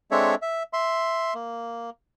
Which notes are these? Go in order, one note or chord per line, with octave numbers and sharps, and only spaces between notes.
G#3 C4 D4 A4 C#5 E5
E5
E5 C6
A#3